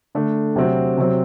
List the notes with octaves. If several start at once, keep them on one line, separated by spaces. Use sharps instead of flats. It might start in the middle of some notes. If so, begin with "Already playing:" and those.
D3 A3 D4
C3 F#3 C4 F#4
C3 F#3 C4